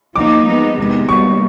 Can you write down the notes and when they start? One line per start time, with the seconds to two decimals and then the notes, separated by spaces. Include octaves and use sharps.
0.16 F3 A#3 D#4 D6
0.46 F3 G#3 B3 D#4
0.77 E2 C3 D#3 G#3 B3
1.09 B2 G3 A#3 C#6